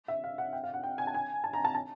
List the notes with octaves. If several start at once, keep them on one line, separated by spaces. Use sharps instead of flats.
E5
F5
F#5
G5
F5
F#5
G5
G#5
A5
G#5
A5
A#5
A5
A5